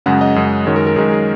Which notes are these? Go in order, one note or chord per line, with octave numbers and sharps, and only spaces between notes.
F#2 C#3 G#3 F#5
D#5
F#2 C#3 G#3
F#2 D#3 G#3 C#5
A#4
A#4
F#2 D#3 G#3 G#4
G#4